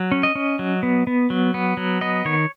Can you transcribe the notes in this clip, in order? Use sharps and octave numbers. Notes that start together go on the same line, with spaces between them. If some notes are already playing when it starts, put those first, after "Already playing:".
Already playing: F#3
C#4
D#5
C#4
F#3
B3
B3
F#3
B3
F#3
B3 D#5
D#3 C#5